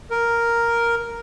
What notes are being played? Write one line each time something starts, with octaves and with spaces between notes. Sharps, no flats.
A#4